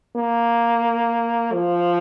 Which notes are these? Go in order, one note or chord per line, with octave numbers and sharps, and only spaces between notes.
A#3
F3